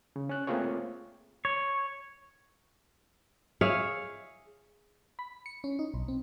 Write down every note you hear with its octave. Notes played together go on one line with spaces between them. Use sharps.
C#3
C#4 F#6
A3 A#3 C4 F4 G#4 C#5
C#5
G#4 C#5 E5 F5
B5
C#7
C#4
D#4
B1
C4